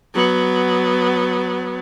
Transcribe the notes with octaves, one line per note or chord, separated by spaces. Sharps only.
F#3 B3